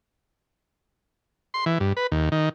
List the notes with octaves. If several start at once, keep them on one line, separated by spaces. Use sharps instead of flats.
C6
E3
G2
B4
D#2
D#3